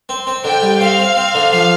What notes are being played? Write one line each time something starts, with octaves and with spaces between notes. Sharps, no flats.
C4
C4
D3 G5
G3
C4 F5
C4
C4
D3
F3